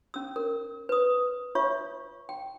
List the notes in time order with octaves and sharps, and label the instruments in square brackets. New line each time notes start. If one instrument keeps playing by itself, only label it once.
[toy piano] C#4 E6
A#4
B4 D#6
F4 C#5 E5 C#6
G5